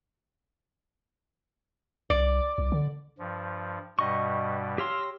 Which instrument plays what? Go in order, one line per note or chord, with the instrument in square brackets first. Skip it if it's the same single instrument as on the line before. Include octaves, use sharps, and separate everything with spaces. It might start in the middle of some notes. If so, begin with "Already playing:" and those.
[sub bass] C2 [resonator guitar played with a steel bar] D5
[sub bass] C2
D3
[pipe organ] G2 F3
[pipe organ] G2 B2 G3 [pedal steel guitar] D#5 C#6
[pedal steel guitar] G4 C#5 C6 [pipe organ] F5 E6 A#6